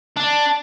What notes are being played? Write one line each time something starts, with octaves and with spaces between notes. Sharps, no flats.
D4